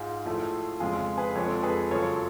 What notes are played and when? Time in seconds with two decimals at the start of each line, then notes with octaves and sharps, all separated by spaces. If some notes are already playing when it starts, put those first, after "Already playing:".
Already playing: G#2 G#3 F4 G#4
0.26 A2 F3 A3
0.80 F2 C#3 G#3 F4 G#4
1.18 G#4 B4
1.36 F2 F3 G#3 A4 C#5
1.52 A4
1.63 G#4 B4
1.91 F#2 C#3 F3 A4 C#5